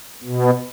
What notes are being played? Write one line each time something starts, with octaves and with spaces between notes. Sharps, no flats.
B2